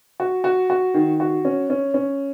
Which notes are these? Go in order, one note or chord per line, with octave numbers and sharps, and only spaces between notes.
F#4
F#4
F#4
D#3
F#4
C#4
C#4
C#4